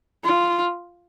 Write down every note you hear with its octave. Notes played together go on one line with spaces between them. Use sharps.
F4